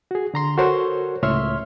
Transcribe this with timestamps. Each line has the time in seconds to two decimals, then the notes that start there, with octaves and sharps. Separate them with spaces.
0.11 F#4 G#4
0.34 D3 A#5 C6
0.58 F#4 A4 A#4 C5 C#5 C6
1.23 C#2 A2 C#5 E5 C6 F6